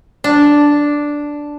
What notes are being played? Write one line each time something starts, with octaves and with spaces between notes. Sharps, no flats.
D4